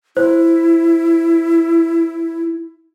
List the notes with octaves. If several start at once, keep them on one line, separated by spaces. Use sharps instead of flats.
E4 C5